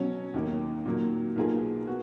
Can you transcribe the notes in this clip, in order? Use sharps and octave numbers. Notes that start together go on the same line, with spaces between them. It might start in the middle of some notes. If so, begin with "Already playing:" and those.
Already playing: B2 F#3 C#4
D#2 D#3 A#3
A#2 F#3 A#3
B1 B2 A#3 F4 G#4
B3 F#4